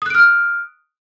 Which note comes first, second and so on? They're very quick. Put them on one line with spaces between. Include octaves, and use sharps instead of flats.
D#6 F#6 D7 F6